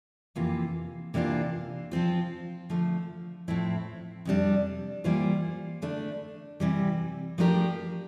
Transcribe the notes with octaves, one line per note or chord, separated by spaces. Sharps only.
F2 C3 E3 A#3 F4
C3 E3 A#3 D4 F4
F3 C4 F4
D3 F3 A3
A2 F3 C4 E4
F2 C3 G3 D4
E3 G3 A#3 F4 C5
D3 A3 D4
C3 E3 G3
F3 A3 D4 G4 A#4